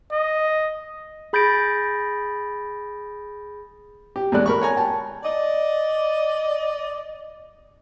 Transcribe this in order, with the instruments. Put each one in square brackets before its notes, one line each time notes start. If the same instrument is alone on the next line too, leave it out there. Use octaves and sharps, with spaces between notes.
[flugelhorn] D#5
[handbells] G#4 B5 G6 A6 A#6 D7
[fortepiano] G4
E2 G#3 A3 D5 F#6
A#4 B5 C#6
C#5 G#5 A#5
G5 A5
[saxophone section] D5 D#5